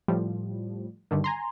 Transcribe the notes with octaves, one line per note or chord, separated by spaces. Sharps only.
A2 F3 G3
G2 D3 D#3
G#5 A#5 C6